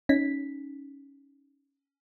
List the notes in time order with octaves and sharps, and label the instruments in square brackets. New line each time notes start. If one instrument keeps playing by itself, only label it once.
[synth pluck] C#4 D#4 B6